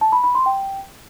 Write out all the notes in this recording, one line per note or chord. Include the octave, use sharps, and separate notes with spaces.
A5
B5
B5
C6
G5